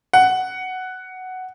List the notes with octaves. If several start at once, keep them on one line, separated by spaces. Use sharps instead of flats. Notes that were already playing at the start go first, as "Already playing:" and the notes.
F#5